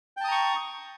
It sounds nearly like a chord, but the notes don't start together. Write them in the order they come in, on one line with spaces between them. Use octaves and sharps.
G5 A5 D#6 A#5 C#6